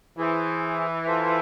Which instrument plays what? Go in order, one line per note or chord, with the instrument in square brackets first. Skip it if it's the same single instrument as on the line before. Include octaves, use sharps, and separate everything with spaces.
[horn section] E3 [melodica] E4 G#4 C5
[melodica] F4 A4 C5 E5